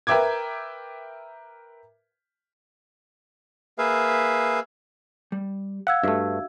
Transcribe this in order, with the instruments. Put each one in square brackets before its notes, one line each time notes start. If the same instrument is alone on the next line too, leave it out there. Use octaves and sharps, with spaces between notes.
[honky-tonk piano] A#4 B4 E5 G5 D6 G#6
[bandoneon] A#3 G#4 B4 E5 F5
[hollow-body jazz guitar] G3
[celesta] F5 E6 G#6 [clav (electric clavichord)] F#5
[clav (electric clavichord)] G2 A3 [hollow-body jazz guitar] D4 F#4 E5